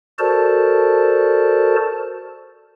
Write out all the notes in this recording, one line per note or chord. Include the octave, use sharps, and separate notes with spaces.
F#4 A4 A#4 C5 D5 A5